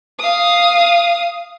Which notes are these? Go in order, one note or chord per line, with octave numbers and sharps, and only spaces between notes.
F5 D#6